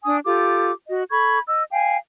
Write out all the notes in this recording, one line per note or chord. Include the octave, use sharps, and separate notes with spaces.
D4 G#5 D#6
F4 G4 A4 D6
F#4 D#5
A4 B5 C#6 G#6
D#5 E6
F5 G5 G#5